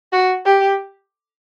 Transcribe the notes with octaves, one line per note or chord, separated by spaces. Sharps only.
F#4
G4